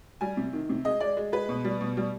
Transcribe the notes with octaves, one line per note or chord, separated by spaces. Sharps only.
G3 G#5
C3
D#3
C3
G#3 D#5
G#3 D5
G#3
G#3 B4
B2
G3
B2
G3